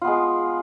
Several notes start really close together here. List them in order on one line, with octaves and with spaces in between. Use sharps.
F4 B3 G#3